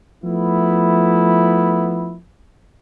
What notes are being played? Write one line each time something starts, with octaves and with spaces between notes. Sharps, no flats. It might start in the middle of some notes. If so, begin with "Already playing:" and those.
F3 A3 B3 E4